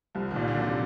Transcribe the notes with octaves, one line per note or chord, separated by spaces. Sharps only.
C2 F3
D#3
A#2
D3
F#3
C3